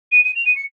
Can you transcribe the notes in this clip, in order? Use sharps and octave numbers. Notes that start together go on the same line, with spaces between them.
D#7
D#7
F7
D#7
C#7